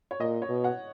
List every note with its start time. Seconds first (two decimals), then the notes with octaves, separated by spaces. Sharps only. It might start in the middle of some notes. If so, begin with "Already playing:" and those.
0.11 C#5
0.20 A#2 D#5
0.42 C#5
0.49 B2
0.64 F#5